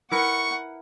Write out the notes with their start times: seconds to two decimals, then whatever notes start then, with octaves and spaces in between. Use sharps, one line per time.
0.12 E4 A#4 B4 F#5 C#6